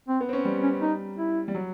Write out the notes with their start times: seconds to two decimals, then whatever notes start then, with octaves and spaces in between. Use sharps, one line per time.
0.08 C4
0.21 B3
0.29 C4
0.33 C#4
0.45 G3
0.64 C#4
0.82 D#4
1.18 E4
1.48 G3
1.54 F#3